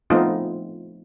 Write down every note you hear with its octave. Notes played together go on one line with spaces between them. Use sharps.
F3 A3 B3 C4 D#4 F4